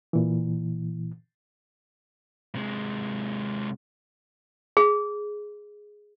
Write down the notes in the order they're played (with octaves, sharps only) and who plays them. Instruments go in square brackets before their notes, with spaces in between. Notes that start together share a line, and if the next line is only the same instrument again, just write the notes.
[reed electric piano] A#2 E3
[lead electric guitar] C3 G#3
[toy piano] G#4